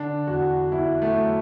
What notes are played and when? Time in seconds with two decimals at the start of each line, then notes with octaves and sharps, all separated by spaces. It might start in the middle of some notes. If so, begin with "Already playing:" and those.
Already playing: D3 D4
0.27 E2 F#4
0.72 E2 E4
1.02 A3
1.17 F#3